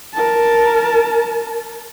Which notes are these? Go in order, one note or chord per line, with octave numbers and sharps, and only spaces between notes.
A#4 A5